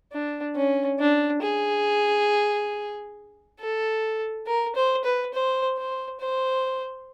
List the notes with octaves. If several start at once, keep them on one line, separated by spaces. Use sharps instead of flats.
D4
C#4
D4
G#4
A4
A#4
C5
B4
C5
C5
C5